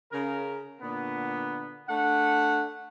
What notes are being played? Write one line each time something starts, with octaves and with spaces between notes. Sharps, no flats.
C#3 A#4
A#2 D3 B3
A3 D4 F#5